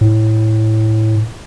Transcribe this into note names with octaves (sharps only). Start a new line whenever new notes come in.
A2